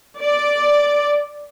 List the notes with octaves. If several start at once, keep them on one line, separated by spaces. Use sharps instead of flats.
D5